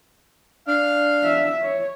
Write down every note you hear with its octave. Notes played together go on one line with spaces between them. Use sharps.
D4 F5
E5
C#5